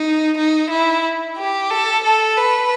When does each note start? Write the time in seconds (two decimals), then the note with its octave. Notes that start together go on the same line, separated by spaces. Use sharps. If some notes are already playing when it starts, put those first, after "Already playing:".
Already playing: D#4
0.37 D#4
0.70 E4
1.37 G4
1.70 A4
2.03 A4
2.37 B4